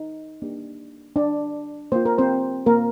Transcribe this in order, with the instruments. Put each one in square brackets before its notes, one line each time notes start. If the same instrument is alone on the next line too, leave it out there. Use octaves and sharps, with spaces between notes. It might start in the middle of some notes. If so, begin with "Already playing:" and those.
Already playing: [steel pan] D#4
A#3 D4 G4
D4 D5
A#3 F4 C5
A#4
C4 C5
A#3 A#4